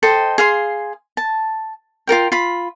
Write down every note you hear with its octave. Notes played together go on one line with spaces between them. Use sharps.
A4 C5 D#5 G5
G#4 F5 C6
A5
F4 A4 A#4 G5
F4 B5